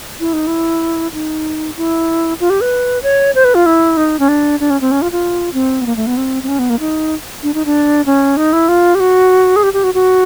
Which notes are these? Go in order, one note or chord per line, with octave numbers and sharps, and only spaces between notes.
E4
D#4
E4
D#4
E4
F4
G4
B4
C#5
C5
B4
F4
E4
D#4
C#4
D4
D4
C#4
C4
C#4
F4
F4
C4
B3
A#3
A3
B3
C4
C4
C#4
B3
A#3
D#4
D4
D#4
D4
C#4
D#4
E4
F4
G4
F#4
G#4
G4
G4
F#4
F#4